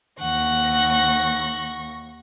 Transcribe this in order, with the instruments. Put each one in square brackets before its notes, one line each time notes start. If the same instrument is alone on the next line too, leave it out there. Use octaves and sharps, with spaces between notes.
[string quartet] D#2 C#6 A#6 [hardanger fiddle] F#5